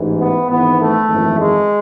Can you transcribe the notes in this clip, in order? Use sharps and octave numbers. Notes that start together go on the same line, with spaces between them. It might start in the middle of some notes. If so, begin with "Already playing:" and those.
Already playing: A1 G#2 E3
B3
G#1 G#2 E3 B3
A3
G#1 F#2 E3
G#3